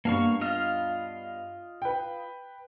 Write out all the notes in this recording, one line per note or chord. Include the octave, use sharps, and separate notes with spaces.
G2 A#3 B3 F5 A5 C#6
F4 D#5 F5
B4 G5